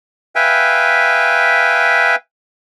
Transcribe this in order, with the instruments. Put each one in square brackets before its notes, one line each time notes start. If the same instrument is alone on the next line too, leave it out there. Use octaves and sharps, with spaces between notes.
[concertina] B4 E5 F5 G5 G#5